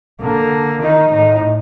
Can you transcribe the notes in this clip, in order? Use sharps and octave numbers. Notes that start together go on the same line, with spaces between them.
D3 A#3
D#3 D#4
A2 D#4